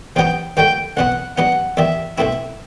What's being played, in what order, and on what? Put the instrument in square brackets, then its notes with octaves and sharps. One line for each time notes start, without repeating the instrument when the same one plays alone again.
[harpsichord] E2 C3 F#3 B3 D#4 [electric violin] G5
[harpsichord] G2 D#3 F#3 A3 [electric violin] G5
[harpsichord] C2 B2 F#3 B3 [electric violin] F#5
[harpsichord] G2 F#3 B3 D#4 [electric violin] F#5
[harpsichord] E2 D#3 G3 [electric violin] E5
[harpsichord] C2 B2 A3 C4 E4 [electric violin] E5